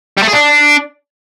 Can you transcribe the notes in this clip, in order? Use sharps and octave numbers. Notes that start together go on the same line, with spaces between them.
G3
A3
G#4
D4